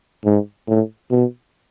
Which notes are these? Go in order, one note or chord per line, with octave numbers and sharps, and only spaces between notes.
G#2
A2
B2